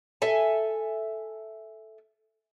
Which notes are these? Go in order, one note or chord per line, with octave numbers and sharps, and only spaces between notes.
A4 E5 G#5